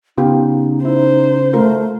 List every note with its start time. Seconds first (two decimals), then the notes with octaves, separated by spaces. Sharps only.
0.18 C#3 B3 D#4 F4 G4
0.85 D#4 E4 C5
1.53 A3 F4 A#4